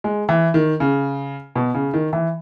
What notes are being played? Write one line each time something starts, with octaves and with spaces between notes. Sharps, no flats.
G#3
E3
D#3
C#3
B2
C#3
D#3
E3